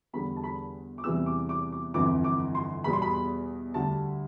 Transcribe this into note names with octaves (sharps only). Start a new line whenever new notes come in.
E2 D3 G3 B5
A5
B5
D6
E2 C3 E3 G3 E6
D6
D6
D6
G1 F2 E3 D6
D6
C6
E2 B2 G3 B5
C6
B5
D2 D3 G3 A5